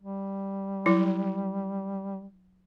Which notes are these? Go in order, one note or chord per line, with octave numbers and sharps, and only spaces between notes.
G3
F#3 E4